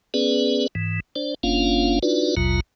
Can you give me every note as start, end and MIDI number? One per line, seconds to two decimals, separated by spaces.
0.14 0.67 59
0.14 0.67 61
0.14 0.67 68
0.14 0.67 71
0.14 0.67 74
0.75 1.00 44
0.75 1.00 52
1.16 1.35 62
1.16 1.35 72
1.16 1.35 74
1.43 1.99 30
1.43 1.99 58
1.43 1.99 61
1.43 1.99 62
1.43 1.99 65
1.43 1.99 77
2.03 2.35 62
2.03 2.35 63
2.03 2.35 65
2.03 2.35 66
2.03 2.35 71
2.03 2.35 74
2.37 2.60 33
2.37 2.60 39
2.37 2.60 47
2.37 2.60 54
2.37 2.60 65
2.37 2.60 82